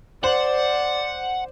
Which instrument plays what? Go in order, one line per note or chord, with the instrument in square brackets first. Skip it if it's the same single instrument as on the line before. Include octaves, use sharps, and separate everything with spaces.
[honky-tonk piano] C5 [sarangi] D5 [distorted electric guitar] F#5